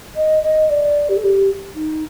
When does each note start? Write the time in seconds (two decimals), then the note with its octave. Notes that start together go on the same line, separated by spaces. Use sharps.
0.15 D#5
0.43 D#5
0.69 D5
1.09 G4
1.17 A4
1.23 G4
1.75 D#4